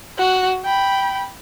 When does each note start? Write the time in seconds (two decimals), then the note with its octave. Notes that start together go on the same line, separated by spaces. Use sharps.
0.18 F#4 F#6
0.64 G5 B5